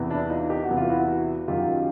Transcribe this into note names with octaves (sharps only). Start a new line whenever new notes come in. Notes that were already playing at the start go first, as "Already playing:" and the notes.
Already playing: E2 C3 E3
D4 E4
D#4 F4
G4
F#4
E2 C3 E3
F4
E4 F#4
F#2 D#3 F#3 F4 G4